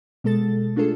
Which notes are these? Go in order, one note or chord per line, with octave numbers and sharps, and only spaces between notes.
B2 G#3 A4 A6
A3 D4 F4 G#4 A4